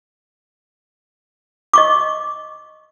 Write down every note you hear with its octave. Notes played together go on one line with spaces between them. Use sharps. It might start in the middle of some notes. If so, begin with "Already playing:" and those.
D#5 C#6 D6